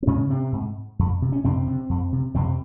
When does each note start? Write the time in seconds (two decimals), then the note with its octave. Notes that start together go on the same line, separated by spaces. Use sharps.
0.02 C4
0.07 G#2 C#3 C#4
0.30 C3 C4
0.52 G#2
0.99 F2
1.22 C3
1.32 C#4
1.44 F2 C3 C4
1.67 C3
1.89 F2
2.12 C3
2.34 F2 C3 C4